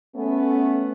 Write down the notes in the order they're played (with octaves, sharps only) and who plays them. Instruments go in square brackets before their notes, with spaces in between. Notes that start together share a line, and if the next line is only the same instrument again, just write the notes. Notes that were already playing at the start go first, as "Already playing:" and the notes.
[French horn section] A3 B3 C#4